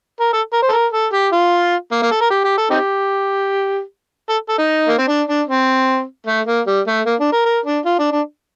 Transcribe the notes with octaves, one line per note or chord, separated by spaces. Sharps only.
A#4
A4
A#4
C5
A4
A#4
A4
G4
F4
A#3
A#3
A4
A#4
G4
G4
A4
C4 D#4 G4
A4
A4
D#4
A#3
C4
D4
D4
C4
A3
A#3
G3
A3
A#3
D4
A#4
A#4
D4
F4
D4
D4